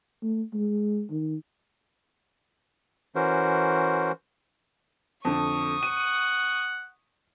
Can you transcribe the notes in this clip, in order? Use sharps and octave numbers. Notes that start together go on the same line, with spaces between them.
A3
G#3
D#3
E3 C#4 F#4 A#4 C5
F2 D3 C#6 D#6
F#5 D#7